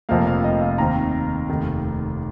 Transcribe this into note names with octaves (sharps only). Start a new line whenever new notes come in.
F1 F2 F3 A#3 F5
F5
D#5
F5
D#2 D#3 C4 F5 A#5
F1 D#2 D#3